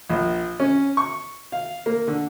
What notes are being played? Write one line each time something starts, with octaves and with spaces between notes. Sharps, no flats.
A#1
C#4
C#6
F5
A#3
D3